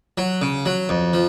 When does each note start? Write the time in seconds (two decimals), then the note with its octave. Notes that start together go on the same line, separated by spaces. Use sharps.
0.18 F#3
0.42 C#3
0.66 F#3
0.89 F2
1.13 F3